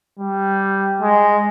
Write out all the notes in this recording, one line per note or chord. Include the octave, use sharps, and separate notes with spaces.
G3
G#3